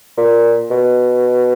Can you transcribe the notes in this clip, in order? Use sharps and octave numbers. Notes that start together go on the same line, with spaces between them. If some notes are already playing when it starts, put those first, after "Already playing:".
A#2
B2